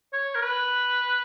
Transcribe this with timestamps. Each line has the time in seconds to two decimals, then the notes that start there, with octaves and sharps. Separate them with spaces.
0.13 C#5
0.35 A#4
0.42 B4